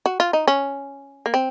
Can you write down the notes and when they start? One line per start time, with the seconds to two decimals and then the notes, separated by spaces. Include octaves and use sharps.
0.06 F#4
0.20 F4
0.33 D#4
0.48 C#4
1.26 A#3
1.34 C4